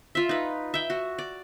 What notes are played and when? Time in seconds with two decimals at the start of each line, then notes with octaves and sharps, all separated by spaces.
0.15 F4 E5
0.29 D#4 B4
0.74 E5 G5
0.90 F#4
1.19 D5